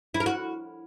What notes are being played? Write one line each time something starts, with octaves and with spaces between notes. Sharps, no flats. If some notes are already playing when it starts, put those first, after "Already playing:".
E4
A#4
F#4